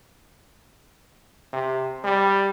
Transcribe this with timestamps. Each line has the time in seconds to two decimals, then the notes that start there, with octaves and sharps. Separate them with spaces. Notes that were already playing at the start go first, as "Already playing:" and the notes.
1.53 C3
2.04 G3